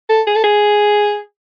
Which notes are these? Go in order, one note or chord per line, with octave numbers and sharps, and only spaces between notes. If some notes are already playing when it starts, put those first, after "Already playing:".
A4
G#4
A4
G#4